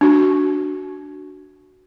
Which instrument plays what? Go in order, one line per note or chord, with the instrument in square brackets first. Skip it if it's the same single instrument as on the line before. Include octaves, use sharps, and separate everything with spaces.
[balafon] D4 F#4